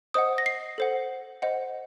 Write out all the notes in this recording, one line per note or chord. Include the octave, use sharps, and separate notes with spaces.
C5 D#5 F#5 D#6
A#6
C7
A4 C5 F#5
C5 D#5 F#5